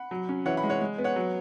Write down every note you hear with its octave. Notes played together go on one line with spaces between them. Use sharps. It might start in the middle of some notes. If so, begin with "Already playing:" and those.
Already playing: F#5 B5
F#3
C#4
E3 C#5 F#5
F#5 B5
G#3
C#5 F#5
G#3
B3
C#5 F#5
F#3